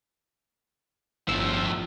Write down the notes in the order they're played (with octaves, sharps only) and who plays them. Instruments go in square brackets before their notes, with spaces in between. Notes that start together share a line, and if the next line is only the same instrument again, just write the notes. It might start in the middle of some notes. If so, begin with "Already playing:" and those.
[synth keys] G1 E6 [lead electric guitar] A2 F3